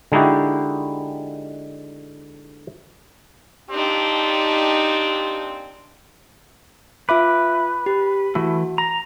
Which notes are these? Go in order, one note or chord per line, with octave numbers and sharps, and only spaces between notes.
D3 G#3 D#4 E4 F#4 G4
A#2 C4 D4 D#4 G4
F4 B4 E5 D6
G4
E3 A3 E4 F#4
A#5 A#6